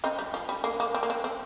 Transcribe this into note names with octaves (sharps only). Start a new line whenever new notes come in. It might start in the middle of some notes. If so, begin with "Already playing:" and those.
C4 D#4
G3
F3
G3
A#3
A#3
C4
A#3
C4
C4